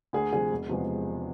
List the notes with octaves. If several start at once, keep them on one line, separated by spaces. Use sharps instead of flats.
D2 G#4
C3 F3 G#4
E1
E2 C3 F3 G#3